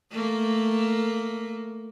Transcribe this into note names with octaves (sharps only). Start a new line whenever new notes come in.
A3 A#3